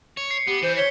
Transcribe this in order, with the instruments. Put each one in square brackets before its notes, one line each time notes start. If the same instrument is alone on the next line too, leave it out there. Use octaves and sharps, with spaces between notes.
[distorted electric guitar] C#5
[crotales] C7 C#7
[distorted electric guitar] B3 [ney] G4
[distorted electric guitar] E3 [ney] C5
[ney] C#5 [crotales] B6 C#7 G7